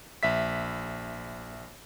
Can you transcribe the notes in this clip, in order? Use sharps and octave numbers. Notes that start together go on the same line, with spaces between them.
A#1 E5 B6